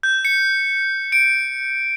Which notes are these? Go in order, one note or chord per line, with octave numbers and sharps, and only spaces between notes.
G6
C#7
D7